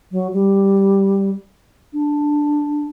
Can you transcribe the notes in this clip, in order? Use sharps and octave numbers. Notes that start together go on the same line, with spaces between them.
F#3
G3
D4